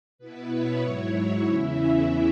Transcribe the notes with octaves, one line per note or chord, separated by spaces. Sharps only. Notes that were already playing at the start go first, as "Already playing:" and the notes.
B2 B3 E4 B4
C#5
G#2 F#3 E4 C#5
E2 C#3 E3 C#4 E4 E5